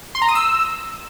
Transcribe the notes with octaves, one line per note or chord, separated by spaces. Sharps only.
C6
A#5
D#6
E6